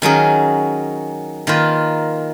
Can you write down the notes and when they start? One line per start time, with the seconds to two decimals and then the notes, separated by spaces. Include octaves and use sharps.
0.02 D#3 F#3 C#4 G#4
1.47 D#3 A#3 F4 B4